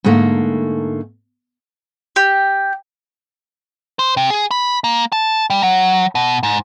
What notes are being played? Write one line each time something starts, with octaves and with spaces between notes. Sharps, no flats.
G#2 D3 A3 A#3
G4
C5
C3
G#4
B5
A#3
A5
G3
F#3
B2
G#2